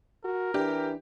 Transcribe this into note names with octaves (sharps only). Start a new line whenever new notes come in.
F#4 A#4
E3 D4 G4